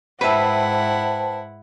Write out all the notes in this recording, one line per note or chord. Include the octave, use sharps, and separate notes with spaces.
G#2 E4 B4 C5 E5 F#5 G5 A5